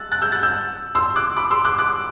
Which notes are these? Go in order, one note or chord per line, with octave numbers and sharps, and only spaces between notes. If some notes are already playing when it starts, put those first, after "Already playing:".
Already playing: E6 F#6 A6
F#6 A6
E6 G6
F#6 A6
E6 G6
C6 E6
D6 F#6
B5 D6
C6 E6
D6 F#6
D6 F#6